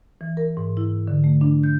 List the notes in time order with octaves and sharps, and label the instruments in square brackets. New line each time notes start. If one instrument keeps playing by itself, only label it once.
[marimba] E3
A#4
G#2
E4
D3
A3
D4
G6